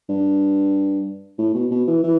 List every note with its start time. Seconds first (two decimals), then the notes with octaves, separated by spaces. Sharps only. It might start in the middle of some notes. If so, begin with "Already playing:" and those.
0.09 G2
1.38 A2
1.54 B2
1.71 B2
1.87 E3
2.03 E3